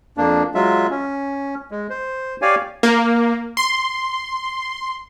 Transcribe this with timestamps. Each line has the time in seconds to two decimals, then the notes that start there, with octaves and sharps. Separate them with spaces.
0.17 F2 A#3 D4
0.55 F#3 G#3 F4 E5
0.90 C#4
1.71 G#3
1.90 C5
2.42 G4 C#5 D5 F5 G#5
2.83 A#3
3.57 C6